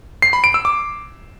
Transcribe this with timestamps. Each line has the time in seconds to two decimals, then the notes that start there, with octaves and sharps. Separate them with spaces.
0.22 C7
0.33 B5
0.44 D7
0.54 E6
0.65 D6